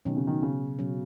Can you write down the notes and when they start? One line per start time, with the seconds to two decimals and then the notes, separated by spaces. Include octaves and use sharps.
0.05 B2 D#3 F#3 C#4
0.17 C#3
0.27 D#3
0.43 C#3
0.79 B2 F#3 C#4